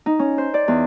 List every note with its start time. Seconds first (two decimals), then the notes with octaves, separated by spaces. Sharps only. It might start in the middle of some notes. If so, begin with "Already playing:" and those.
0.06 D#4
0.19 C#4
0.38 C5
0.54 D5
0.68 E2